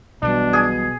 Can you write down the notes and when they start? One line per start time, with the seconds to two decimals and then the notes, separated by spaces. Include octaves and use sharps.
0.22 B1 B2 E3 G3 D4
0.53 G#4